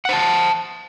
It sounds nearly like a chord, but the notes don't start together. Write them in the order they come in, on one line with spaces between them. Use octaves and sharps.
F#5 C5 A5